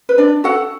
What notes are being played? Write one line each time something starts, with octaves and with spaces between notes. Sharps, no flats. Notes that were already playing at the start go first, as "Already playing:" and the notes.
B4
D4 D5
F#4 A4 F#5